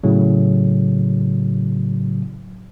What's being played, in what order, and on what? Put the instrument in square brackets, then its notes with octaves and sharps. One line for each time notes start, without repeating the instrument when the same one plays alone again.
[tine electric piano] A2 C#3 F#3